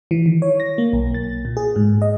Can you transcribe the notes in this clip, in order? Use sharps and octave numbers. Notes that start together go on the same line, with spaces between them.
E3
D#3
C#5
A#6
A#3
B1
A6
A#2
G#4
G#2
D#5